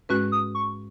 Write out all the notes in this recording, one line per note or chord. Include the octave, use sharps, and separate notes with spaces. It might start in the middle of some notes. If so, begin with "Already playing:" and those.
G#2 G#3 C#4 F#4 B4 F#6
D#6
C#6